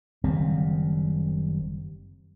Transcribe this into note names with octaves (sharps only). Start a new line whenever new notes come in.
F#1 D#3 G3 C4